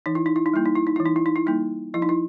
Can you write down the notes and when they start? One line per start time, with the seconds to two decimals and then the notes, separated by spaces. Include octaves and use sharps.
0.06 E3 D#4
0.15 E4
0.26 D#4
0.36 E4
0.46 D#4
0.54 G3 A#3 E4
0.65 D#4
0.76 E4
0.87 D#4
0.96 E3 E4
1.06 D#4
1.16 E4
1.26 D#4
1.36 E4
1.46 G3 A#3 D#4
1.94 F3 E4
2.02 D#4
2.09 E4